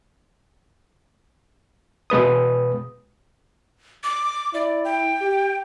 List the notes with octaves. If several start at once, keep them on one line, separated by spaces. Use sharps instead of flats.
B2 G#3 B4 D#6
D6
E4 D5
G5
G4